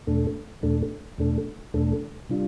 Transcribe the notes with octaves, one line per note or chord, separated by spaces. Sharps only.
E2 B2 A3 D4 A4
E2 B2 A3 D4 A4
E2 B2 A3 D4 A4
E2 B2 A3 D4 A4
C3 G3 D4 F4